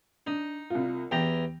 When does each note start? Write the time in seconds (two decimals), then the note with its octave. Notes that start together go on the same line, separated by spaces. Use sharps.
0.27 D4 D#4
0.70 C2 F4
1.11 E2 G4 G5 A#5